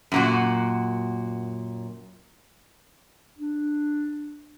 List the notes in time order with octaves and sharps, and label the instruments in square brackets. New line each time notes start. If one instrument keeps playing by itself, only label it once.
[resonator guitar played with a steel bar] F#2 A#2 F#4
[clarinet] D4